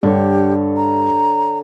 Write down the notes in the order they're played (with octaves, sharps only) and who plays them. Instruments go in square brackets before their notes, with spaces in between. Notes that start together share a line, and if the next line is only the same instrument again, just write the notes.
[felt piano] G2 [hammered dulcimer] D3 C#5 [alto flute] G4
[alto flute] A#5